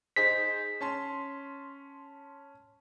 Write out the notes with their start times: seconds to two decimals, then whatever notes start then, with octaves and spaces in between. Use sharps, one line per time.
0.16 D#4 G#4 C5 B6
0.81 C#4 A5 C6